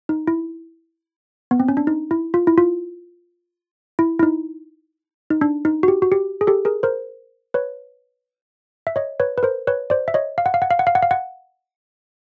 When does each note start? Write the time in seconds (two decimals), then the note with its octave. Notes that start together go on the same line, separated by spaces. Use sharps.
0.09 D#4
0.27 E4
1.51 B3
1.60 C4
1.68 C#4
1.77 D4
1.87 D#4
2.11 E4
2.34 F4
2.47 E4
2.58 F4
3.99 E4
4.19 E4
4.23 D#4
5.30 D#4
5.41 D4
5.65 D#4
5.83 F#4
5.88 G4
6.02 F#4
6.12 G4
6.41 G#4
6.47 G4 A4
6.65 G#4 A#4
6.83 A#4 C5
7.54 B4 C#5
8.87 E5
8.96 C#5 D#5
9.20 B4 C#5
9.38 B4
9.43 A#4 C5
9.67 B4 C#5
9.90 C5 D5
10.08 E5
10.14 C#5 D#5
10.38 F5
10.46 F#5
10.54 F5
10.62 F#5
10.71 F5
10.79 F#5
10.87 F5
10.95 F#5
11.02 F5
11.11 F#5